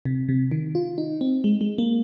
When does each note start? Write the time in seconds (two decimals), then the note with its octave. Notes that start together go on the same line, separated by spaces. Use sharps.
0.05 C3
0.29 C3
0.52 D#3
0.75 F4
0.98 D#4
1.21 C4
1.44 G#3
1.61 G#3
1.78 A#3